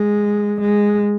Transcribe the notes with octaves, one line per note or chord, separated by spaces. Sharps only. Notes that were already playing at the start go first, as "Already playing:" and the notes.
Already playing: G#3
G#3